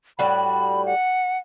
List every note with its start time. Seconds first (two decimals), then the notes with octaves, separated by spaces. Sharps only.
0.19 A2 G3 F#4 B5
0.86 F#5